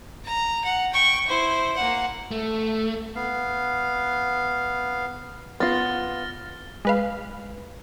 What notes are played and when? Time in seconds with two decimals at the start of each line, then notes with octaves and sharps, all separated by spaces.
0.25 A#5
0.64 F#5
0.93 G5 C#6
1.27 E4 C5
1.76 A#3 F#5
2.31 A3
3.15 B3 F5
5.60 B3 F4 F6 A6 A#6
6.85 G#3 B4 F5